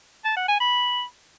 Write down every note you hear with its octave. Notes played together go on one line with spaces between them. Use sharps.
A5
F#5
G#5
B5